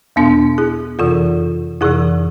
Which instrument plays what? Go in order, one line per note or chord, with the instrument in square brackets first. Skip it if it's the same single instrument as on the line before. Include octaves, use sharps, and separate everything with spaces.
[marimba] E2 B2 B3 D4
E4 G#4
F2 C3 E3 F4 A4
F2 C3 E3 E4 G#4